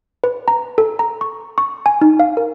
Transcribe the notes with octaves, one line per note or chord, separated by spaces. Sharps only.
B4
A#5
A4
A#5
C#6
C#6
G#5
D#4
F5
A#4